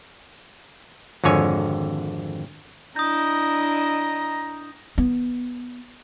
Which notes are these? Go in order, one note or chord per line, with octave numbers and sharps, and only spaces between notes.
G#1 F2 D3 C#5 G#5
D4 E4 D#5 A#5 D#6 G6
B3